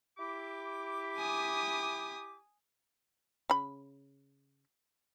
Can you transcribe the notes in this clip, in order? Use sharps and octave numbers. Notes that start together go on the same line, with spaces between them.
E4 G4 D6
G#5 D#6
C#3 B5